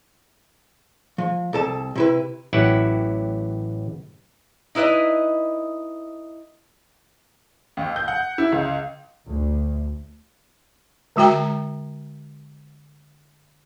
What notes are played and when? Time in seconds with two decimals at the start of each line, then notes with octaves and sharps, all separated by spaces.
1.18 F3
1.53 C2 A4 A5
1.95 C3 E4 B4
2.53 A1 F#3 E4 G4 F#5
4.75 D#4 E4 B4 D5 D#5
7.77 D#2
7.96 G6
8.08 F#5
8.38 E4
8.52 C#2
9.28 D2
11.16 D3 G#3 F#4 G5 A#5